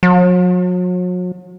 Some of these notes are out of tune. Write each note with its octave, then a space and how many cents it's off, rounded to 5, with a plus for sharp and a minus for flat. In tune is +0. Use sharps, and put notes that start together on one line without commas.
F#3 -40